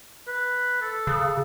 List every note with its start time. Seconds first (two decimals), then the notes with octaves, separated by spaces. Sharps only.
0.27 B4
0.81 A4
1.07 C#3